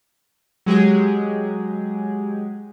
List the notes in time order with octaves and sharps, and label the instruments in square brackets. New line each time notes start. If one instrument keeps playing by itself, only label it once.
[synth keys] F#3 G#3 G4 G#4